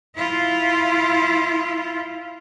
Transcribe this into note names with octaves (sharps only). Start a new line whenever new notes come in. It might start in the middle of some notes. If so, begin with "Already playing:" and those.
E4 F4